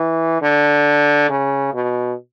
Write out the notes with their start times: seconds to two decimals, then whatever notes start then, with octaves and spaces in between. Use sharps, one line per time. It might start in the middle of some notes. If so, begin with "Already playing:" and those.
Already playing: E3
0.42 D3
1.29 C#3
1.74 B2